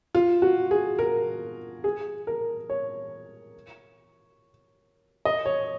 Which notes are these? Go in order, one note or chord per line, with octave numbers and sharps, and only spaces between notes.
F4
F#4
G#4
A#4
G#4
A#4
C#5
D#5
C#5